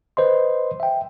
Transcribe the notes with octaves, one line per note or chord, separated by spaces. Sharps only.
B4 C5 D#5 C6
E5 G5